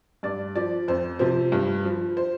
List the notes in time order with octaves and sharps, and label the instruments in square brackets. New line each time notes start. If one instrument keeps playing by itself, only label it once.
[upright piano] G2 D5
F3 D5
F2 C5
C3 F3 C5
G2
F3
C5